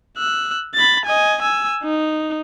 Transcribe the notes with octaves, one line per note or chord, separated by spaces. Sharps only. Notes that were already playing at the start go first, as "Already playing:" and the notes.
E6 F#6
B5 A6
D#5 G#5
G#5 E6
D#4